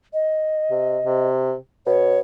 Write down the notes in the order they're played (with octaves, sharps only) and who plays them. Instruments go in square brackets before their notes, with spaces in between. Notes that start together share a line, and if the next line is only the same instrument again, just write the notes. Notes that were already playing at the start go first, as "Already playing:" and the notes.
[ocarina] D#5
[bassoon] C3
C3
[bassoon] B2 [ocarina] C#5